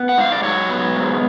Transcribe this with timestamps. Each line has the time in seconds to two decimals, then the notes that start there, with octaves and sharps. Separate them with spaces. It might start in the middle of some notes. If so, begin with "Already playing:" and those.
Already playing: B3 B4
0.09 F#5
0.18 G#2 F5
0.32 D5
0.43 F#3 C#5
0.70 B3
0.96 G#2